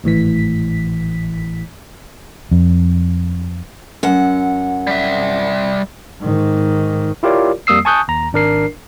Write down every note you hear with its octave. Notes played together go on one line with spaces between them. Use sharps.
G#1 A2 E3 B6
F2
F#2 F#5
G3 E5
G#2 D#3
E4 F4 G4 A#4 C#5 D5
F2 G3 A#3 D#6 E6 C7
G#5 A5 C#6 D#6 F#6 G6
D#2 A#5
G#1 D4 A#4 C7